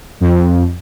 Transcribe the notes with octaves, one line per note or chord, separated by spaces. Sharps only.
F2